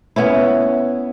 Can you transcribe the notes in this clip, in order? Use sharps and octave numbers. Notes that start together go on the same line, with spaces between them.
B3 C#4 E4